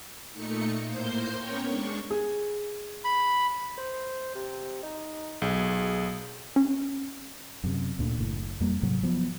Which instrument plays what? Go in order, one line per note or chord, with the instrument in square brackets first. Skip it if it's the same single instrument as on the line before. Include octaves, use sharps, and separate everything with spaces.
[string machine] A#2 A3 D#4 C#7
A2 A#3 C5 C6 G6
B3 C#4 A#4 C#5 G5 C#6
G#3 D4 C#6
[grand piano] G#4
[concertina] B5
[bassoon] C5
C3
D#4
[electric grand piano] B1 [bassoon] G#4
[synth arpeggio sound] C#4
[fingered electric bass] F#2 C3
D2 A#2 D3
F#1 A2
F2 G3 A#3
G#2 C3 F#3
F3 F#3 B3